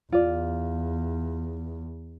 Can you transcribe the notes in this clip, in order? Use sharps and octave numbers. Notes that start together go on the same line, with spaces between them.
E2 F4 D5